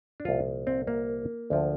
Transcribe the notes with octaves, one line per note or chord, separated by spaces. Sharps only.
D4
C2 A#2 F3 F4
C4
A#3
D2 D3 F3